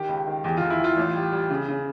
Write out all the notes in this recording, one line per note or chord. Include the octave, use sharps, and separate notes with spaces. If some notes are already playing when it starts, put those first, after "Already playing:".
Already playing: D#3 G4
C#2
D#3
E2 G4
F4
E2
E4
E3 F4
A1
G3
G3
C#3
C#3